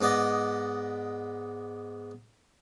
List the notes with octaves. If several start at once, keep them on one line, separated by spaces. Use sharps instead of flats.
G#2 B3 D5 D#5